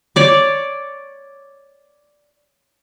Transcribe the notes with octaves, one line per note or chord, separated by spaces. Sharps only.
C#5 D5 D6